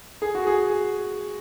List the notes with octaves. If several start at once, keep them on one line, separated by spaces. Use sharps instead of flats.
G#4
F#4
G#4